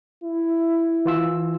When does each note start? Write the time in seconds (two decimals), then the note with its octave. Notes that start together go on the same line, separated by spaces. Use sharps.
0.23 E4
1.05 E3 F4 E6